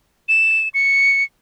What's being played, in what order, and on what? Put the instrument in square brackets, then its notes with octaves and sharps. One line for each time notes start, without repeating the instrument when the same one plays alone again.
[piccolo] E7
C#7